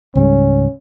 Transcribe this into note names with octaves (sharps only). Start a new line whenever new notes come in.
C#2 G#2 G3 C#4